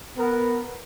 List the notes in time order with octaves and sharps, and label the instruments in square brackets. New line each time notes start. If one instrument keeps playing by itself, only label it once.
[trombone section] B3 A#4